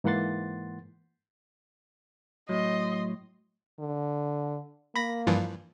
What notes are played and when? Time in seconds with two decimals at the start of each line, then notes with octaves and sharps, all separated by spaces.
0.04 G#2 E3 A#3 F#5 C6 A6
2.49 A2 F#3 D#5 C6
3.80 D3
4.95 A#3 B5 A#6
5.27 G2 E3 F3